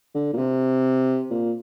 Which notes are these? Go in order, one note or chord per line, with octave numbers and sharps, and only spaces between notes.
D3
A#2
C3
A#2